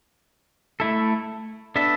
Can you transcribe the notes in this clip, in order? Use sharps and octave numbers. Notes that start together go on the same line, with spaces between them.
A3 E4 A4
B3 D4 A4 E5